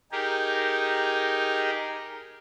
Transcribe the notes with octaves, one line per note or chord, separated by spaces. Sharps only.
D#4 G4 G#4 A#4